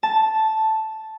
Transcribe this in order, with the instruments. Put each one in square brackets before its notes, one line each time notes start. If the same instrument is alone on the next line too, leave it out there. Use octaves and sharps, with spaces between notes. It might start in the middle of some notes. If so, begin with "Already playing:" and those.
[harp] A5